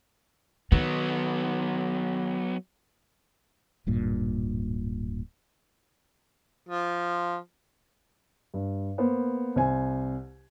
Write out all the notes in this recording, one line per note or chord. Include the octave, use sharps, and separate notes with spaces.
D#3 F#3 B3
D1 G2 A#2
F3
G2
A#3 B3 C5
C2 C5 G#5